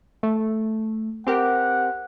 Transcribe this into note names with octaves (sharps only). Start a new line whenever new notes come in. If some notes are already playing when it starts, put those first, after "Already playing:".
A3
C4 G4 A#4 F#5